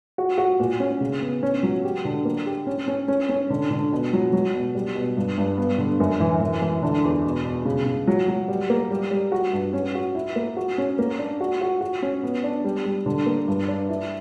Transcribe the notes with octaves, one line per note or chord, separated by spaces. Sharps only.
F#4
F#4
A#2
C#4
C#3
B3
C#4
F#3
G4
D3
A#3
G4
C#4
C#4
C#4
C#4
D3
D3
B2
F#3
F#3
B2
G3
B2
G2
G2
B3
D3
F#2
E3
E3
E3
D3
E2
B2
B2
C#3
C#3
F#3
F#3
G3
A#3
G3
G3
F#4
G2
C#4
F#4
E4
A#3
F#4
C#4
A#3
D4
F#4
F#4
F#4
C#4
B3
D4
G3
G3
D3
A#3
G2
D4
E4